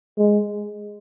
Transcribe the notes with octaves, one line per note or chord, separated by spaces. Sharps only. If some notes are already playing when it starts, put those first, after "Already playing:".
G#3